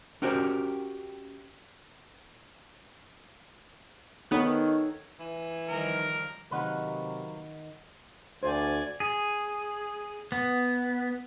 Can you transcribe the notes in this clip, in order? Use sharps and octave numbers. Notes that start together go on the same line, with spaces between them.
C#4 F#4 G4 A#4 C5
D#3 B3 D#4 A4 C#5 F#6
E3
D#3 F3 G3 A#4
C3 D#3 F#3 A#3 B4 F#5
D2 C5 D5 G#5
G#4
B3